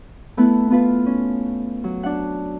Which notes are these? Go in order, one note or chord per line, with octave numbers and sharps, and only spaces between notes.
A3 B3 E4 F#6
B3 F4 B4
C#4
F#3
D4 F#5